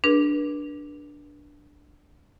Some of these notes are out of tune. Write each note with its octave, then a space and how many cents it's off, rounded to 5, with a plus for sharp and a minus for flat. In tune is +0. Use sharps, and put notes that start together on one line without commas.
D4 +0 G#4 +0 B4 -40